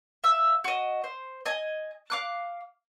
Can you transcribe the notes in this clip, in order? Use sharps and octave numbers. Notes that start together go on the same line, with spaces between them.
E5 F5 E6
F#4 D#5
C5
D#5 G#5
F5 D6 F#6